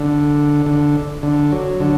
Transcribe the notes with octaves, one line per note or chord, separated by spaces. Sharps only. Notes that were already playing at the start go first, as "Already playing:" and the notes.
Already playing: D3
D3
D3
F#3
D3